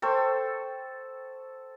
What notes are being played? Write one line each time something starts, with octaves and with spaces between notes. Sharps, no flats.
A4 C5 G5 C#6